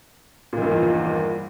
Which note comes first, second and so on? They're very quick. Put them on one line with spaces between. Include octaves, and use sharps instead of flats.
A#2 D#3 G2 F3 E2